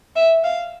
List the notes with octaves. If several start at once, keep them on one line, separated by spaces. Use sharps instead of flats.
E5
F5